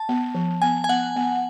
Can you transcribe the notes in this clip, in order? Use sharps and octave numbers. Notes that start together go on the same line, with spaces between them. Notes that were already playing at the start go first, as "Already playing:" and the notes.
Already playing: A5
B3
F3
B3 G#5
G#5
B3 F#5
B3